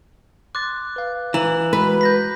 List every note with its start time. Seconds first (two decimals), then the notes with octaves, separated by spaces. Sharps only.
0.55 C6 D6 F#6 A6
0.96 B4 F5
1.34 E3 A#5 F#7
1.73 G#3 F#4 B4 F#6
2.01 G6 A#6 B6